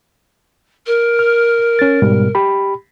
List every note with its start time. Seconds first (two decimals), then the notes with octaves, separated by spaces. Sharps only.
0.86 A#4
1.19 F6
1.79 C#4 A6
2.02 G#2 B2 G3
2.35 G4 B5